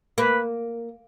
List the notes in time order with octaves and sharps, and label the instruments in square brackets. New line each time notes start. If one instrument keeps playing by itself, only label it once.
[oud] A#3 [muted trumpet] B4